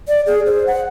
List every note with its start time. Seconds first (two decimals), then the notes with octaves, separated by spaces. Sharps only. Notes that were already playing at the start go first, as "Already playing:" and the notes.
0.08 D5
0.26 G#4
0.46 C5
0.67 F#5